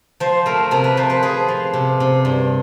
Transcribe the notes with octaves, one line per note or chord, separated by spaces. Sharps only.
F3 C5
A3 A#4
C3 A#4
B4
F3 C5
B4
F3 G#4
F3
C3
C3
G2